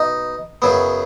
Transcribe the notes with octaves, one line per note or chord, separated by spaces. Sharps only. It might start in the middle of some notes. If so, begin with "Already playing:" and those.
Already playing: B2 D#4
F#2 C#3 F#3 B3